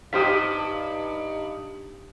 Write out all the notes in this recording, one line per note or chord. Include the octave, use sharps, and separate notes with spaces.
G2 D#4 G4 C5 F5 D#6 B6